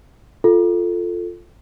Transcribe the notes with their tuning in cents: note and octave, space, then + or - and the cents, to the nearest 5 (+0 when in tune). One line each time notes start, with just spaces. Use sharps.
F4 +0 A4 +0